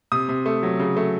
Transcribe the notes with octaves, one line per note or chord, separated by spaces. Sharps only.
C3 D#6
C3
A3
F#3
C#3
A3